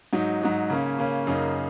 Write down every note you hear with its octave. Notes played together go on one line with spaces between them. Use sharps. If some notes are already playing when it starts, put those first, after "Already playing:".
G#2 F#3 D#4
G#2 F#3 D#4
C#3 A#3 C#4
C#3 A#3 C#4
F#2 C#3 A#3 D#4